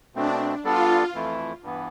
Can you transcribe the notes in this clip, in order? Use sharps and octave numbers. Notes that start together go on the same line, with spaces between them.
B2 A3 C4 D4
G3 B3 D4 F4 A4 D5
F2 E3 A3 E4
G2 E3 B3